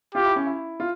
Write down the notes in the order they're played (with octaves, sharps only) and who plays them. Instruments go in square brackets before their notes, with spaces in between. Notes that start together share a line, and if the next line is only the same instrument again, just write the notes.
[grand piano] F4 [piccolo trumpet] G4
[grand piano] E4
C#4
E4
F4